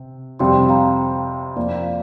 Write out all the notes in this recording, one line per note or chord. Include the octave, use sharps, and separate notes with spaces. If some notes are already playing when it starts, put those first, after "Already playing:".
Already playing: C3
F2 C3 G3 G5 C6
G5
F5 A#5
F2 F3 A#3 D5
F5